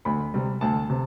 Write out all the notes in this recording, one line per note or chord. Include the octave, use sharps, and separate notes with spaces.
D2 B5
C3 G3
D2 A5
C3